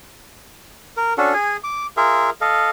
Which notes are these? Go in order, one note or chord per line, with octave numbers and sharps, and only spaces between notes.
A#4
C#4 D4 F#4 A4
G#4 G#5
D6
F4 G#4 A#4 E5
A4 D#5 F5